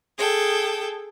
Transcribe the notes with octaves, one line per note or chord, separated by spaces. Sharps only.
G#4 A4 G5